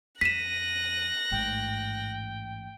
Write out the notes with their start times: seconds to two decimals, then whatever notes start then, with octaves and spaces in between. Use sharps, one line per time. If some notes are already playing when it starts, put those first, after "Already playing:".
0.21 F2 F#6 A#6 B6 D#7 E7
1.31 A1 G#2 G5